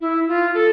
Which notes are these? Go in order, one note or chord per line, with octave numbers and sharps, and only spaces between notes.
E4
F4
A4